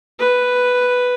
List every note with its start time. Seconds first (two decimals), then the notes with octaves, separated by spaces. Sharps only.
0.19 B4